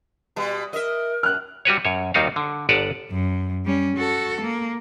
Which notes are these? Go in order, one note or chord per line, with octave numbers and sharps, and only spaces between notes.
B2 G3
A#4 D#5 E5
F#2 F6 F#6
G3 F#4 B4 C#5
F#2 C#5
D#2 D#3 G3 D#4 F#4 F5
D3
G1 B4 D5 F#5 A5 A#5
F#2
G3 C#4
F#4 A4
A#3